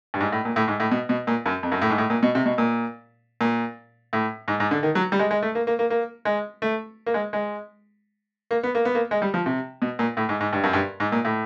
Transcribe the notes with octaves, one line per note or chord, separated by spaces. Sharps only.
G2
G#2
A2
A#2
A2
G#2
A2
B2
B2
A#2
F#2
F2
F#2
A2
G#2
A2
A#2
B2
C3
B2
A#2
A#2
A2
G#2
G#2
D3
D#3
F#3
G3
G#3
G#3
A3
A#3
A#3
A#3
A#3
G#3
A3
A#3
G#3
G#3
A#3
B3
A#3
B3
A#3
G#3
G3
F3
C3
B2
A#2
A2
G#2
G#2
G2
F#2
G2
G#2
A#2
A2